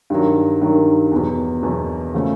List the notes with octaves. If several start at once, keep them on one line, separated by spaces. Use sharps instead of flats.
G2 D#3 F#3
G2 D#3 F#3
E2 B2 F#3 B3
E2 B2 F#3 B3
C#3 F3 A3 C#4